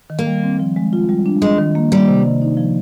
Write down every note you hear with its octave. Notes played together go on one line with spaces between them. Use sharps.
D#3
A#3
G3
C4
F3
G#3
F4
G3
D4
G#3 D4
D#3
A#3
G3 A#3
C3
D#3
D#4
F3